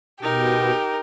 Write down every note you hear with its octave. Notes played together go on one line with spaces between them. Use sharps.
B2 D#4 G4 A#4